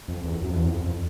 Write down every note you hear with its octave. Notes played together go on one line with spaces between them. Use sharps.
F2
E2
F#2
F2
E2
F2
F2